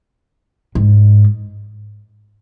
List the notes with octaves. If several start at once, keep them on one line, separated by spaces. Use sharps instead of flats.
G#2